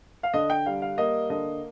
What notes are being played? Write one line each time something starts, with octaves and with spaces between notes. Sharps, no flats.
F5
D3 D#5
G5
G3 F5
F5
A#3 D#5
D3 D#5